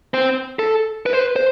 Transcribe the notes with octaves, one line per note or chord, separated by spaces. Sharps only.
C4
A4
B4
C5
B4
C5